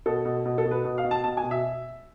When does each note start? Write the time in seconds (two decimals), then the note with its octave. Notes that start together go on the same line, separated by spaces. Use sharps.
0.06 B2 A4
0.25 B2
0.45 B2
0.58 A4
0.66 B2
0.71 B4
0.85 B2
0.98 F5
1.04 B2
1.11 A5
1.24 B2 A5
1.37 G#5
1.43 B2
1.51 E5